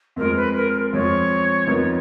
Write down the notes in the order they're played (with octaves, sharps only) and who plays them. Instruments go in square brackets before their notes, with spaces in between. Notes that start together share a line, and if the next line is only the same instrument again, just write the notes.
[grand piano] F2 F3 G#3 [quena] A#4
[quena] B4
A#4
A#4
[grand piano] F2 F3 G#3 [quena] C#5
[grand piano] F2 F3 B3 D#4 A#4